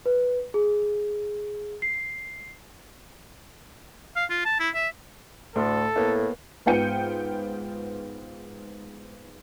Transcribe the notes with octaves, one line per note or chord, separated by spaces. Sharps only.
B4
G#4
C7
F5
F4
A5
E4
E5
D2 A2 A4 C6
A2 A#3 B3
G#2 B3 F4 G5 C#7 D#7